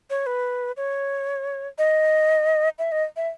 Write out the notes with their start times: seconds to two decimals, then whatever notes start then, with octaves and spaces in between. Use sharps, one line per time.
0.10 C#5
0.26 B4
0.77 C#5
1.78 D#5
2.79 E5
2.92 D#5
3.16 E5